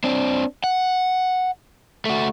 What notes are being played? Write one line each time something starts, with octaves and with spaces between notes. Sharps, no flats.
C4 D4
F#5
A3 F#4